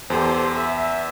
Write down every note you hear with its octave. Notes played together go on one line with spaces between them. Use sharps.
E2 G4 A4 C5
E5